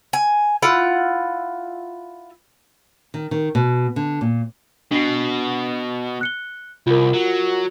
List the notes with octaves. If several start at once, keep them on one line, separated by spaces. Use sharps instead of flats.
G#5
E4 F4 F#5
D#3
D#3
B2
D3
A#2
B2 D4 C7
F#6 C#7 G7
C2 F4 A#4
F#3